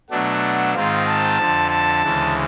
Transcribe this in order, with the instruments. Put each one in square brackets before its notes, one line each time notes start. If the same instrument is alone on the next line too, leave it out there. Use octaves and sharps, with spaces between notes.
[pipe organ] B2 F#3 A3 D4 [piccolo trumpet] F#5
[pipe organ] G#2 D#3 G#3 C4 F4 [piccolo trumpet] F5
[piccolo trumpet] A5
[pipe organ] F2 D3 F3
[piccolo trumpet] A5
[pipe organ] D2 C#3 E3 G#3